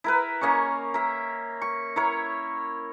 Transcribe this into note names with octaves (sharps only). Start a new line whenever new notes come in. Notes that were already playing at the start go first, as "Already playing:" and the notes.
E4 A#4 B4
A#3 C#4 D#5 C#6
A#4 E5
C#6
E4 A#4 C#5